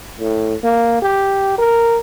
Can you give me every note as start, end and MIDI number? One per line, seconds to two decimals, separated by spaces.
0.20 0.54 45
0.63 1.02 58
1.02 1.54 67
1.58 1.99 70